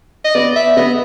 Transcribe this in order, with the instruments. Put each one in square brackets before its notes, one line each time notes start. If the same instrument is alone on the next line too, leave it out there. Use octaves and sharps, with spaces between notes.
[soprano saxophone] D#5
[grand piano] B3 [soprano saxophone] D5
[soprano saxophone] E5
[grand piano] B3 [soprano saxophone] D#5